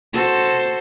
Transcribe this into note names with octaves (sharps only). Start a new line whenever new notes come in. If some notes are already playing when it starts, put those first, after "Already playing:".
F#4 A4 C5